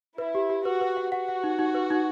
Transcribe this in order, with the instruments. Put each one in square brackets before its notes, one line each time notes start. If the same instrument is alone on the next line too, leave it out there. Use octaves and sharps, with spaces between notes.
[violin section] E4 [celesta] B4
[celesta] G4
G4
[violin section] F#4 [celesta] B4
[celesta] B4
F#5
[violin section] F#4 [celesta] F#5
[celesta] F#5
D#4
D#4
B4
D#4